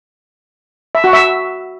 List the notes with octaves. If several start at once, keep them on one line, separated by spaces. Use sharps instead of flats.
E5
F#4
E5